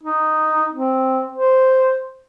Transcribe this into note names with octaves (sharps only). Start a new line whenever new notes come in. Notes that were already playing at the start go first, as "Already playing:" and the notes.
D#4
C4
C5